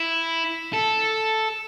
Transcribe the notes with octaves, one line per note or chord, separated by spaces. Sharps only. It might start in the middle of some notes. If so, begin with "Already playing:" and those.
Already playing: E4
A4